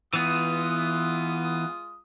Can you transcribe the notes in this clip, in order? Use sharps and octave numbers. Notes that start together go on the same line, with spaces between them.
E3 G#3 B3 F4 D#6